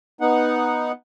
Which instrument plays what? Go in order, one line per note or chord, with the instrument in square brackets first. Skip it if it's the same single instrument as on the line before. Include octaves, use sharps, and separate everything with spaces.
[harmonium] B3 D#4 F#5